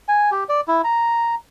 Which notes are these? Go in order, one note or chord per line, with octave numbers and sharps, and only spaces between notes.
G#5
G4
D5
E4
A#5